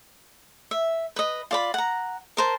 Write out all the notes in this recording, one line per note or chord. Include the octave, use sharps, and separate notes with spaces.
E5
B4 D#5
F4 D5 B5
F#5 A#5
A#4 C5 A5